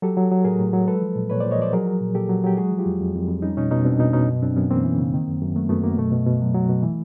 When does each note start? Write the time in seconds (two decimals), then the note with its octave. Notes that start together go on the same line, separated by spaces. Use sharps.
0.02 F#3 G4 A4
0.17 F#3
0.32 F#3
0.45 A2 G#4 A#4
0.59 A2
0.73 F#3
0.88 G#3 A4 B4
1.02 F3
1.15 A#2
1.30 A#2 B4 C#5
1.40 A#2 C5 D5
1.51 C#5 D#5
1.58 F3 C5 D5
1.73 F#3 G#4 A#4
1.86 F#3
2.01 A#2
2.15 A#2 G4 A4
2.29 F#3
2.44 F#3 G4
2.57 G#3 F#4 G#4
2.72 F3
2.79 F4 G4
2.86 F2
3.01 F2
3.15 F2
3.29 F2
3.42 G3 C#4 D#4
3.57 B2 C#4 D#4
3.71 B2 C#4 D#4
3.85 B2 C4 D4
3.99 B2 C#4 D#4
4.13 B2 C#4 D#4
4.27 F#2
4.42 F#2 C4 D4
4.56 F#2 B3 C#4
4.70 E3 A#3 C4
4.85 E3
4.98 C#3
5.14 D#3
5.27 F#2
5.42 F#2
5.56 F#3 A3 B3
5.69 F#2 A3 B3
5.83 F#2 A#3
5.98 B2 A3
6.12 B2
6.26 B2
6.41 F#3
6.54 F#3
6.69 B2
6.83 E3